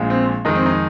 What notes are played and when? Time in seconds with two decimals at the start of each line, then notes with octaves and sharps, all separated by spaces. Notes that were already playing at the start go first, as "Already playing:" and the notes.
Already playing: A#1 A#2 G#3
0.10 C4
0.45 F2 D#3 G#3 D#4
0.55 C4
0.66 D#4